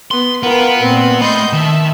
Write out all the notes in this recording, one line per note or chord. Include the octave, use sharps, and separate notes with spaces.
B3 C6
B3 F4 A#4 B4 G5
A#2 C4
A3 D#5 B5 C6 G6
D#3 E5 A5